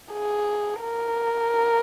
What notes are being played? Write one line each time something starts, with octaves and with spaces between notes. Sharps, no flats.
G#4
A#4